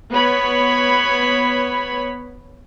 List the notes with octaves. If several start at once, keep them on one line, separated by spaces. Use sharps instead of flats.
B3 C#5 B5